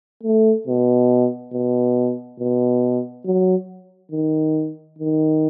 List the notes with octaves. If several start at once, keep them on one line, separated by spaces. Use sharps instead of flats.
A3
B2
B2
B2
F#3
D#3
D#3